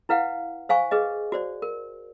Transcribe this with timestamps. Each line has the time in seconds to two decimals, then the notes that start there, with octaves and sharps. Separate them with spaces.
0.09 E4 B4 F5 F#5
0.69 C5 F5 G#5 C#6
0.91 G#4 B4 D#5
1.32 F#4 C5 D5
1.62 A#4